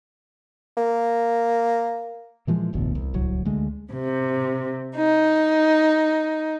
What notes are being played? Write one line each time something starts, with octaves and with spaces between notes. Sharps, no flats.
A#3
A#2 E3 F3 G#3
E1 A1 D2 B2
C2
D1 C2 F#3
D2 G#3
C3
D#4